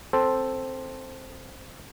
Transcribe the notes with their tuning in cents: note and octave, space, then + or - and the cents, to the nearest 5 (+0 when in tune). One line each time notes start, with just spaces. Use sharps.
C4 +0 A4 +0 C5 +0